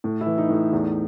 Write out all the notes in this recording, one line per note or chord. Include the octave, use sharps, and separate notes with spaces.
A2
E4
E3
D#4
A2
D#4
E2 D#4